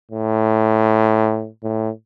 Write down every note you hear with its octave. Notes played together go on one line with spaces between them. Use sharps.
A2
A2